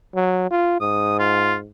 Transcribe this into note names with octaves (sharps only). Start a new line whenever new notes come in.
F#3
F4
G#2 D#6
F4